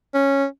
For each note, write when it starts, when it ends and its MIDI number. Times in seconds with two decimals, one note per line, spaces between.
0.14 0.45 61